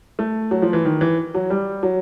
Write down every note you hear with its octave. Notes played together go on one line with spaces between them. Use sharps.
A3
F#3
F3
E3
D#3
E3
F#3
G3
F#3